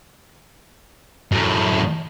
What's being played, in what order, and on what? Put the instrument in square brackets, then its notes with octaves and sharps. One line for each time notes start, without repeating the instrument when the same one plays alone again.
[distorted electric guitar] F#2 A2